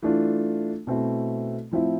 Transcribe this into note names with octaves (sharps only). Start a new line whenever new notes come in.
E3 A3 D4 F4
B2 A3 C4 E4
A2 F3 C4 E4